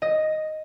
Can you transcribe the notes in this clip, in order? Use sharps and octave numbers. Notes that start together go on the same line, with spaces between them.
D#5